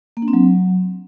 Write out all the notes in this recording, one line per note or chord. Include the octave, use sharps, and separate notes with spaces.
A#3
D4
C4
F#3